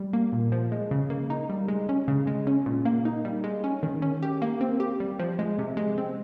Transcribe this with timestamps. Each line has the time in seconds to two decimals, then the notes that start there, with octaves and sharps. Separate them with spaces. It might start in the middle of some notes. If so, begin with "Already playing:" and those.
Already playing: G3
0.13 A#3
0.32 A#2
0.52 F3
0.72 G#3
0.91 C#3
1.10 A#3
1.30 D#4
1.50 G3
1.68 G#3
1.89 C#4
2.08 C#3
2.27 G#3
2.47 C#4
2.66 A#2
2.85 A#3
3.05 D#4
3.25 G3
3.44 G#3
3.64 C#4
3.83 D#3
4.02 C#4
4.23 G4
4.42 A#3
4.61 C4
4.80 G4
5.00 G3
5.20 F3
5.39 G#3
5.59 C3
5.77 G#3
5.98 C4